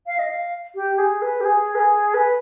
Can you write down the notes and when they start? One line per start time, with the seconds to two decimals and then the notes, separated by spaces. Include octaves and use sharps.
0.06 F5
0.18 D#5
0.29 F5
0.75 G4
0.98 G#4
1.21 B4
1.40 G4
1.44 G#4
1.74 B4
1.79 G#4
2.14 B4